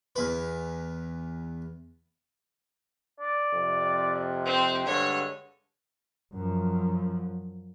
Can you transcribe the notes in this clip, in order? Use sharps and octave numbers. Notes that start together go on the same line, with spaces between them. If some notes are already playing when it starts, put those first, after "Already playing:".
E2 B4
D5
F2 C3
C4 C5
G2 D3 G#3 C#5
F#2 F3